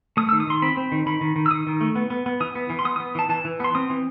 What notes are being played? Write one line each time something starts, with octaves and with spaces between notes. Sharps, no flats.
A3 D#6
D#3 E6
D#6
D#3 C6
C4 B5
C4
D#3
D#3 B5
D#3
D#3
E6
D#3 D#6
D#3
A3
B3
B3
B3
E3 D#6
B3
E3
C6
B3 D#6
B3 D#6
E3 A5
E3 A5
E3
B3 C6
C4 D#6
E3